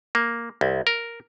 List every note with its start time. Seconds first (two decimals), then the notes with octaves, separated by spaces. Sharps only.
0.15 A#3
0.61 C2
0.87 A#4